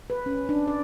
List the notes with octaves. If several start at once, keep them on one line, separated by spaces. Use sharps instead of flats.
B4
C#4
D4
D5